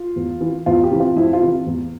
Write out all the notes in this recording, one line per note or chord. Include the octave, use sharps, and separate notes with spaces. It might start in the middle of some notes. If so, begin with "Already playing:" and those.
Already playing: F4
E2
E3
E2 F4
G4
C3 E3
F4
F2 E4
F4
C3 E3
E2